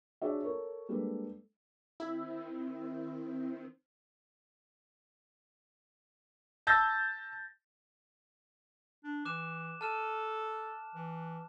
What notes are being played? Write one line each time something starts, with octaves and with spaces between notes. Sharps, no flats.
D4 F#4 G#4 C#5 D5 E5
A4 A#4 C#5
G3 G#3 A#3 D4 A4 B4
D#3 C4 E4
A5 E6 G6 A6 A#6
D4
E3 D6 F#6 E7
A4 A5 F6 E7
E3